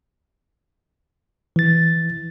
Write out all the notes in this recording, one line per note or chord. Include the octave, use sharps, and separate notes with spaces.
E3 A6